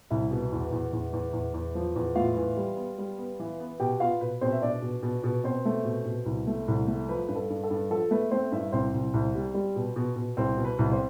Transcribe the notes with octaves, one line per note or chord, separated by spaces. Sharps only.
C2 E4 E5
B2
E2
E2
E2
E2
E2
E2
F3
E2
A2 F4 F5
E3
G3
B3
G3
B3
E3
B3
B2 G4 G5
B3 F4 F5
B2 B4
B2 C4 C5
E5
B2 D4 D5
B2
B2
B2
B2 C4 C5
A3
B2
B2
C2
A3
C2
A3
F3 B4
G2 B4
A4
G2
A4
G2
F3 A4
A3 B4
A3 C4 C5
G2 E4 E5
C2 C4 C5
C2
C2
G3
G3
B2
B2
B2
C2 C4 C5
B2
B4
C2
C4 C5